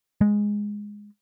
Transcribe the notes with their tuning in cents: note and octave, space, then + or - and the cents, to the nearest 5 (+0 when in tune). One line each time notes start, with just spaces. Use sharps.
G#3 -5